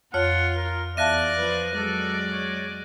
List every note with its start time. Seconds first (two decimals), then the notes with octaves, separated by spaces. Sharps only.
0.14 F2 F4 C#5 F#5 F6
0.56 A#4
0.97 E2 D5 E5 F5 A5 F#6 A#6 D#7
1.37 F3 B4
1.75 F#3 G#3 A4 D5
2.30 C#5